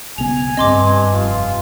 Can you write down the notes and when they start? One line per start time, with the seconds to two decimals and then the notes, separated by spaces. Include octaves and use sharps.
0.18 B1 C#3 B3 G#5 F7
0.57 G2 C4 D#5 C6 D6
1.14 F1 F4